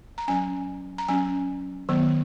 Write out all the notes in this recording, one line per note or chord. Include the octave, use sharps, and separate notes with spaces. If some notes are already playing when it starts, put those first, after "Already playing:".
A#5
F#3 C#4 G#5
A#5
F#3 C#4 G#5
D#3 F#3 B3